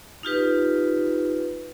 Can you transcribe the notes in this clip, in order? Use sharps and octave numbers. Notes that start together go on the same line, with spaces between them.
D#4 F4 G4 B4